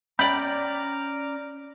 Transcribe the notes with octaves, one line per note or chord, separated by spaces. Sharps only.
C#4 D5 G5 A#5 B5 D6 F6 G6